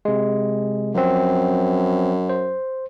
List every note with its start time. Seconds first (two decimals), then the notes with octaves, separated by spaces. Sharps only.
0.05 C3 G#3
0.94 F#2 F3 C4
2.29 C5